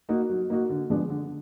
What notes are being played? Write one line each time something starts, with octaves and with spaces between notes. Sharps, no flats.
A#3 D#4 F#4
F#3
A#3 D#4 F#4
D3
F3 G#3 B3 D4
D3